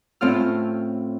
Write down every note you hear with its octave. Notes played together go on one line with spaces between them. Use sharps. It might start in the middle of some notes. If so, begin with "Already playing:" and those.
A2 C4 C#4 F4 F6